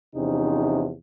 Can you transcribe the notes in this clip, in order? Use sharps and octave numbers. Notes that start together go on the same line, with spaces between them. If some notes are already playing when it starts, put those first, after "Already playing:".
E2 C3 F3 C#4 D#4